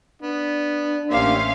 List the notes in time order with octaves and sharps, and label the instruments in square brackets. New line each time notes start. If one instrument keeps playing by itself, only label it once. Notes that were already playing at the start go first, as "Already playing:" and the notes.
[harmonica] B3 [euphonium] D4
[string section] A1 C#4 F5 [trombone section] A#3 G4 [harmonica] C5 E5